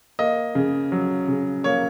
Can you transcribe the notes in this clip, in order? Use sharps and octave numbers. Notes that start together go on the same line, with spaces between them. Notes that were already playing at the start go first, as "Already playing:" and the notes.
A#3 D#5
C#3
F#3
C#3
A#3 C#5